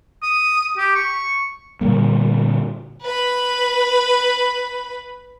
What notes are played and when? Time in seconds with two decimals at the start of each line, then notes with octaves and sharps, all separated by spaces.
0.23 D#6
0.78 G4
0.95 C#6
1.81 A#2 D3 G3 A#3
3.02 B4 B5